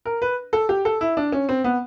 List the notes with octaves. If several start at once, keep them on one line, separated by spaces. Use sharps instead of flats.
A#4
B4
A4
G4
A4
E4
D4
C#4
C4
B3